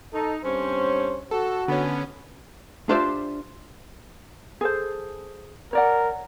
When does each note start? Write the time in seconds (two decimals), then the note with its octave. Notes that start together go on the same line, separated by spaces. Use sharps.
0.13 D#4 A4
0.44 G2 C4 C#4 C5
1.31 F#4 A4
1.68 D3 B3 C#4
2.89 D4 F4 G4 C5 D5 E5
4.61 G#4 A4 C5
5.73 A#4 C#5 D5 F#5